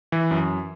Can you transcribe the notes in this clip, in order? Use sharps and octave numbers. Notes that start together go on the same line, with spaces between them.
E3
F#2